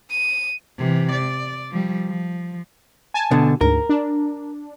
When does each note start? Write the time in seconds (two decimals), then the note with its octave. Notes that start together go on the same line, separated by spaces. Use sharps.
0.10 D#7
0.78 C3 E3
1.12 D5
1.71 F3 G3
2.07 F3
3.14 G#5 A5
3.31 B2 D3
3.61 D2 G#2 A#4
3.89 D4